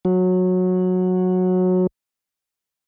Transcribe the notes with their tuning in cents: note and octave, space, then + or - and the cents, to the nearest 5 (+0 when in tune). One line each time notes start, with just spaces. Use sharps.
F#3 -15